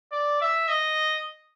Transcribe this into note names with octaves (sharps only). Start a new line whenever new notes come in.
D5
E5
D#5